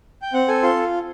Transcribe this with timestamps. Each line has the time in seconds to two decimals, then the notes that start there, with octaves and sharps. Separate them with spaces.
0.22 G5
0.33 C4 F#5
0.48 A4 G#5
0.63 F4 C6